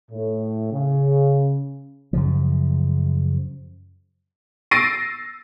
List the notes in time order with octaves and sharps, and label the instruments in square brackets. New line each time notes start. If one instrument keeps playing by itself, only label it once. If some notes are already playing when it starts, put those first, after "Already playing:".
[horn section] A2
C#3
[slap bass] F#2 C#3 F3
[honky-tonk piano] E6 A6 A#6 C7 D7 D#7